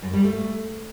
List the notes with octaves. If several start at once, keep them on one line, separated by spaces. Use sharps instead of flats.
F#2
G3
A3